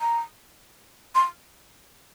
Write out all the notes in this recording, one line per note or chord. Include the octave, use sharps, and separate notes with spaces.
A#5
C6